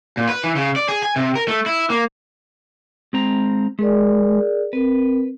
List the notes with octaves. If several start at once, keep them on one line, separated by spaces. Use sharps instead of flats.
A#2
B4
E3
C#3
D5
G#4
G#5
C3
A#4
A3
E4
A#3
G#3 C4 A#5
G#3 G#4 A#4 D5
C4 A#4 B4